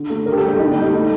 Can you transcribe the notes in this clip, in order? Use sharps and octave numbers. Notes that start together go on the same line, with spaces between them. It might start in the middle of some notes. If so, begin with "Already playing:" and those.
Already playing: D3
A3
D3 A#4
G4
A4
G3
G4
D3 D#4
D4
G3
D#4
A3